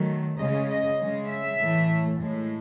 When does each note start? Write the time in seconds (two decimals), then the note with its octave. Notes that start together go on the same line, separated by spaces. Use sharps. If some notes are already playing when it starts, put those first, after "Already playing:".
Already playing: D#3 F#3 A3
0.38 C#3 G#3 D#5
0.68 D#5
0.98 C#3 G#3
1.28 E5
1.58 A2 E3 A3
2.18 A2 G#3